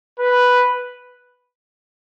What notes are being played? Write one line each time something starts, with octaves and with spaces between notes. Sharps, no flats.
B4